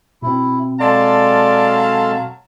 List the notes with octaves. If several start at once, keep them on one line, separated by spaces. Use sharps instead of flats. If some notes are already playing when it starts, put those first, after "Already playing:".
B2 C4 E4
F#3 G#3 A4 D5 F5 A5 C6